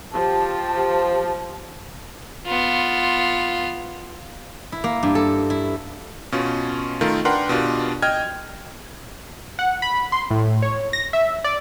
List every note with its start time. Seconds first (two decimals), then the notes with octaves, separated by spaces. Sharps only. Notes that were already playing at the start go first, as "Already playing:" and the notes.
0.12 F3 G4 A5
2.47 B3 F4
4.72 E4
4.84 A#3
5.03 G2
5.15 A4
5.50 E4
6.32 B2 C#4 F4
7.01 D#3 A3 F4 A#4
7.25 D4 A#4 B4 F#5 G5 C6
7.49 B2 D4 F4 G4
8.02 D#5 G5 F6 G#6
9.59 F#5
9.82 B5
10.12 C6
10.31 A2
10.62 C#5
10.93 A#6
11.13 E5
11.44 D5